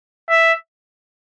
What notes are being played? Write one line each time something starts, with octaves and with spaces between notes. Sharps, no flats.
E5